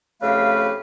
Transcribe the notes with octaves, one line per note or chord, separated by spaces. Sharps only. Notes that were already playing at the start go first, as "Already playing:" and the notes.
F2 C#3 A3 G4 B4 F5